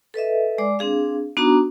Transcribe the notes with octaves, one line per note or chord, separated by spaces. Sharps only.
A4 B4 D#5 E5
G#3 D5 D6
C4 D4 G#4 F5
B3 D4 D#4 F#4 A#5 D6